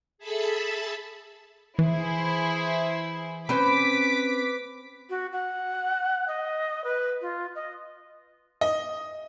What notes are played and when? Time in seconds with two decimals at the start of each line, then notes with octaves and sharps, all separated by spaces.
0.18 G#4 A4 E5 A5 B5 E6
1.79 E3 E4 G#4 C5
3.49 C4 C#4 B4 C5 D6 B6 D7
5.09 F#4
5.32 F#5
6.27 D#5
6.84 B4
7.21 F4
7.55 D#5
8.61 D#5